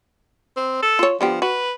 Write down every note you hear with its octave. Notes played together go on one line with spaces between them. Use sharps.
C4
A4
F4 C#5
D3 F3 B3 G4
F#4 B4